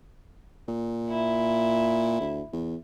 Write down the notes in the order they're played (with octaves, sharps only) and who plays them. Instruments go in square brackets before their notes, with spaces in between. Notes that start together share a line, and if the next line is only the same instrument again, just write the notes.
[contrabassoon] A#2
[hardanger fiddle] E4
[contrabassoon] D2
E2